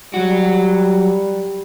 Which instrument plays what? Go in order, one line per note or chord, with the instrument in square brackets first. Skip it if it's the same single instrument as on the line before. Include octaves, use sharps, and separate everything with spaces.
[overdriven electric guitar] F#3 F#4 [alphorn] G3